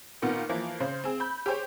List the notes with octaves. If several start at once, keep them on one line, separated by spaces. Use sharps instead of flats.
A#2 D#3 B3 F4
E3 F3 A#3
C#3 C5
C4 G#4
B5 G6
G4 G#4 C5 C#5